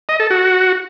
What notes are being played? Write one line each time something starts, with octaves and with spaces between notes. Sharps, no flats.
D#5
A4
F#4